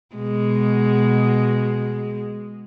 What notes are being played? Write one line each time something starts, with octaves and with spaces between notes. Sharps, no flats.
B2 G#3